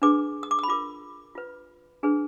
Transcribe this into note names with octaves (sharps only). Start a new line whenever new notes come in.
D4 G#4 B4 D6
D#6
D6
D#6
B5
F4 A#4 D6
F4 B4
D4 G#4 B4